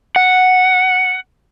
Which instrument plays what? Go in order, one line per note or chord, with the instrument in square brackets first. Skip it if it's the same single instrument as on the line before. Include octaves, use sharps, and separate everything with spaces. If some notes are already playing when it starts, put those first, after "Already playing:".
[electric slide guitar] F#5